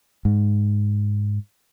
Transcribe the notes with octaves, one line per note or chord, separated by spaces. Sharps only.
G#2